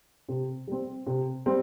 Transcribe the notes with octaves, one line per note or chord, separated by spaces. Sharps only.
C3
G3 C4
C3
G3 C4